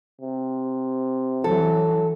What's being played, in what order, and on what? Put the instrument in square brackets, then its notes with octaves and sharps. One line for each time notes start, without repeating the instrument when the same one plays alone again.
[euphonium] C3
[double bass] E3 F#3 [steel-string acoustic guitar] A4